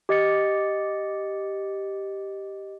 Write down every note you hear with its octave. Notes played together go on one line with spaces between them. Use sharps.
G4 D#5 A6 C#7